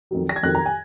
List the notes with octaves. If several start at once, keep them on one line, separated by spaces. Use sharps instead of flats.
F2 D#3 F#3
A#6
G#6
F2 D#3 F#3 F#6
A#5
G#5